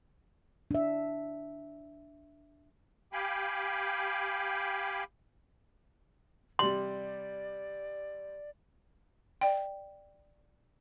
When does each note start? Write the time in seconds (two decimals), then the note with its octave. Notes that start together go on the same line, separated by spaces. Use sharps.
0.71 D4 E5
3.13 G4 F5 G5 G#5 B5
6.59 C3 G3 D5 C6
9.41 D5 G5